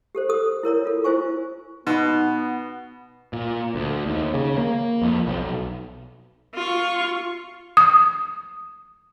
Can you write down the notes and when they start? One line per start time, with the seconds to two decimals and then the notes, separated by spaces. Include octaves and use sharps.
0.15 G4 A4 C5
0.29 A4 D#6
0.63 E4 A#4 C#5 A#5
0.85 F4 A4
1.04 E4 F4 C5 G#5 C#6
1.87 B2 B3 D#4
3.33 A#2
3.75 D2
4.06 D#2
4.34 C#3
4.57 A#3
5.02 F2
5.27 B1
6.54 F4 C#6
7.77 D#6